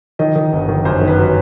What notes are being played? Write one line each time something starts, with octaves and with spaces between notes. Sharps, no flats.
D#3 D#5
D#3
G1
D#3
F#2 C5
D#3
B4
F#3